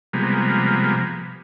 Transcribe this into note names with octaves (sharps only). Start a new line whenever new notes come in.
C3 F3 G3 G#3 A#3 B3